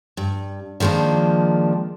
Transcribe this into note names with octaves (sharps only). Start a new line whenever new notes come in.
G2
D#3 F3 G#3 A#3 D4